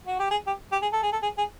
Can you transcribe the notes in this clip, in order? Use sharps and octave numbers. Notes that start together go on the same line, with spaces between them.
F#4
G4
G#4
G4
G4
G#4
A4
G#4
A4
G#4
G#4